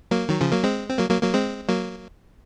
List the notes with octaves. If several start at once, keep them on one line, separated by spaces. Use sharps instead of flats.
F#3 A#3
D#3 F#3
C#3 F3
F#3 A#3
G#3 C4
C4
F#3 A#3
F#3 A#3
F#3 A#3
G#3 C4
F#3 A#3